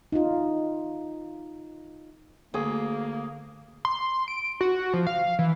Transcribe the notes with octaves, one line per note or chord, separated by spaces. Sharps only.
D#4 F4
D2 A#3 G#4
C6
D7
F#4
F3
F5
E3